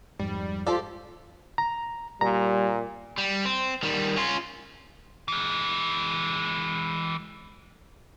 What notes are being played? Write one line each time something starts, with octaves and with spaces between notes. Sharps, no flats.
F2 G#2 G3
F3 F4 G4 A4 D5
A#5
A#2 G3 A#5
G3
C4
D#3 G3
C#4 F4
E3 G#3